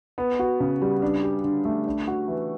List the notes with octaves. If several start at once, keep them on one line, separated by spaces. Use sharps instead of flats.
B3
F#4
C#3
G3
D4
G4
D3
A3
D4
F#4
E3